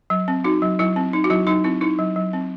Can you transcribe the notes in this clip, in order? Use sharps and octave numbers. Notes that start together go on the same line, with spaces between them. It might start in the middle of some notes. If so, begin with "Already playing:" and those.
F#3
C4
D#4 F#4
F#3
F#3 E4
C4
D#4
F#4
F#3 E4
F#3 D#4
C4 E4
D#4 E4
F#3
F#3
C4